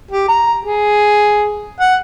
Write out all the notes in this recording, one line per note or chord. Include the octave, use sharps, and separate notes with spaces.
G4
A#5
G#4
F#5